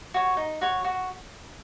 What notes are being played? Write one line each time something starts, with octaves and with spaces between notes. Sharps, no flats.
F#4 C#5
D#4
F#4 C#5
F#4